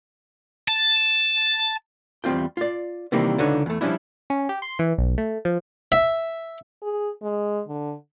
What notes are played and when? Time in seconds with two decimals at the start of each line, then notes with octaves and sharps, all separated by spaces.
0.68 A5
2.24 E2 G3 C4 F4 G5
2.57 F4 D5
3.12 C3 D#3 E3 G3 A#3
3.38 C#2 D3 D#4 B4 C#5
3.66 E2 A3
3.81 F3 G3 C#4 D4 E4
4.30 C#4
4.49 G4
4.62 C6
4.79 E3
4.98 B1
5.18 A3
5.45 F3
5.92 E5
6.82 G#4
7.22 G#3
7.68 D3